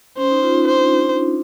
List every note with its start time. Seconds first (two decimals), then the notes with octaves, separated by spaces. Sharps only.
0.17 C#4 C5
0.31 D#4
0.43 F4
0.55 D#4
0.67 D4 C5